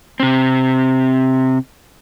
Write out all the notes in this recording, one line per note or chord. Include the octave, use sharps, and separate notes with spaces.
C3 C4